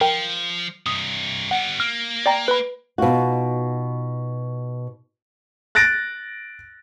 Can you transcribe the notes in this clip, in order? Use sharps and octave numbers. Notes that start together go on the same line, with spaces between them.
F3 A#4 G5
G2 C3 D#6
G3 B3 F#5
A#3 F6
D5 G5 A#5
B4 B5
B2 D#4 F4 F#4
F#6 A6 A#6 D7